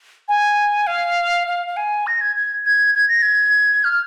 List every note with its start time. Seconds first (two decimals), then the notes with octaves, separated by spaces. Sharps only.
0.28 G#5
0.87 F5
1.47 F5
1.67 F5
1.77 G#5
2.07 A#6
2.21 G#6
2.36 G#6
2.66 G#6
2.95 G#6
3.09 A#6
3.22 G#6
3.84 F6